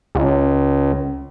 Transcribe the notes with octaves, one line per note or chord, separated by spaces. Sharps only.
C#2